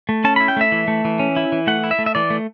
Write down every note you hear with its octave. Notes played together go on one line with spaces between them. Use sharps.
A3
C#4 A5
E4 B5
G5
A3 E5
E3
A3
E3
C#4
E4
E3
A3 F#5
E4
E5
A3
E5
E3 D5
A3